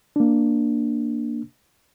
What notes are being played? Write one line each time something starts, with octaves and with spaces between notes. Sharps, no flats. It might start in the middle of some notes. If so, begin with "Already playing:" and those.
A#3 D4